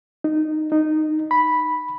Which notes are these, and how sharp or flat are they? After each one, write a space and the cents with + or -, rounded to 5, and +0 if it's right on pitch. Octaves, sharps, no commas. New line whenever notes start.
D#4 -15
D#4 -15
B5 -5